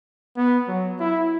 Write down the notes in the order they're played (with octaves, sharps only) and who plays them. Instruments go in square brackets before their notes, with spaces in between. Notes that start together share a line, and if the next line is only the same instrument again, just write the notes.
[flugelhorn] B3
F#3
E4